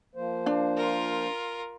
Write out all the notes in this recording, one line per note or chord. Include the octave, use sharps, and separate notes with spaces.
F3 A#3 C5
D4
F4 A#4